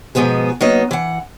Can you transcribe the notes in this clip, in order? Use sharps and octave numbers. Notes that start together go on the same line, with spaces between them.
G#2 B2 F3 B3 G#4
F#3 A#3 B3 D#4 D#5
E3 F#5